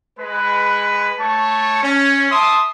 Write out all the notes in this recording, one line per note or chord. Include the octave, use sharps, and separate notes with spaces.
G#3 B4
A3 C#5 A5 C#6
C#4
E5 A5 C6 D6 D#6